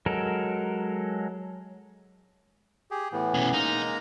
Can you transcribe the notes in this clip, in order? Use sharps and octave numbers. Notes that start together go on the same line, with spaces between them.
F#3 G#3 A4 A#4
G4 G#4
A2 E3 B3
B2 C#4
G#3 A#3 D#4 A#5